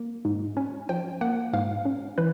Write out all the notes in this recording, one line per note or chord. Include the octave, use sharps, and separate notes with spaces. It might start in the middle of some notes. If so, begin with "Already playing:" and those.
Already playing: A#3
G#2
C#4
F3 G5
A#3 F#5
G#2 F5
C#4
E3 B4